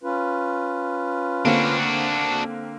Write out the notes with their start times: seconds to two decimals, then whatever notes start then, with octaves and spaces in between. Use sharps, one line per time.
0.03 C#4 F4 B4
1.45 D3 A#3 C4 D4 F#4